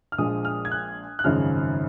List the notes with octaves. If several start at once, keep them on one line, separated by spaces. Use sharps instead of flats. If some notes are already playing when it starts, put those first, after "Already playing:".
F6
A#1 A#2 F3 G#3 D#6
F6
G#6
F#6
F#6
G#1 F#2 C#3 F3 G#3 F6